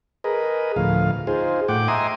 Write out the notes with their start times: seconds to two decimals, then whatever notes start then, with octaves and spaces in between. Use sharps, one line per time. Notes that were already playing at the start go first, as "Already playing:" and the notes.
0.24 G#4 A#4 B4 D#5
0.76 D2 A2 F3 F5
1.27 D#4 F4 G#4 C5
1.68 A2 F#5 G5 D6
1.88 D#5 E5 G#5 A#5 C6 D#6